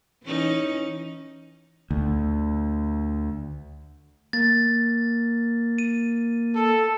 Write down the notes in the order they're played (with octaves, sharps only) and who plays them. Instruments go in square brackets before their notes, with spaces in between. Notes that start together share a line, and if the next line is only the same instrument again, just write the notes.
[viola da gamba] E3 C#4 D#4
[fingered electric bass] D2
[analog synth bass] A#3 [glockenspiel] A6
[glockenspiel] D#7
[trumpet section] A4